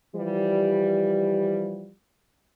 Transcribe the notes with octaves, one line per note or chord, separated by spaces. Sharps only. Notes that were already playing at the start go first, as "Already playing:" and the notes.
E3 F3 G3